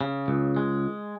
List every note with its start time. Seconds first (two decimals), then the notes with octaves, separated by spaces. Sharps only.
0.01 C#3
0.28 C#2
0.56 G#3